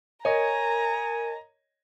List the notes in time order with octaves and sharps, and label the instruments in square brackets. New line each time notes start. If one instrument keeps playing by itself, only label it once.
[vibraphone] A#4 [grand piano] C#5 D#5 [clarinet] G#5 [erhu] A#5